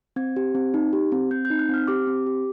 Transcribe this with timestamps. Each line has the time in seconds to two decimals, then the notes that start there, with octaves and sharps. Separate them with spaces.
0.16 C4 G#6
0.36 G4
0.55 C4
0.74 D#4
0.93 G4
1.12 C4
1.31 C4 G6
1.45 G6
1.50 D#4
1.59 F#6
1.69 C4 F6
1.88 G4 D6
2.07 C4
2.26 G4